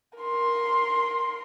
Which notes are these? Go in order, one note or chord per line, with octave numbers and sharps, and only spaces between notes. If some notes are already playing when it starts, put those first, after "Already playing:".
A#4 C6